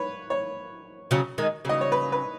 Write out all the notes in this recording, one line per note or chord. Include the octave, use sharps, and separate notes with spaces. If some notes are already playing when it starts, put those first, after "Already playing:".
Already playing: B4 C#5
C#5
C#3 F#3
D#3 G#3
C#3 F#3 D#5
C#5
B4
B4